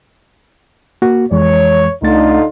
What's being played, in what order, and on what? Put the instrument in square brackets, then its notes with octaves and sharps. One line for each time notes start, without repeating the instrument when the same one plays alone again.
[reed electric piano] A#3 F#4
[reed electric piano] F2 E3 G#3 [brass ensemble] C#5
[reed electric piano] C#2 A3 A6 [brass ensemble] D3 D#4 F4